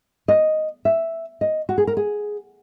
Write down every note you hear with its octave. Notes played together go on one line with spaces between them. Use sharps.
D#5
E5
D#5
F#4
G#4
A#4
G#4